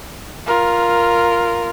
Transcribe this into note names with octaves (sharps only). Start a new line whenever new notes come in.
F4 A#4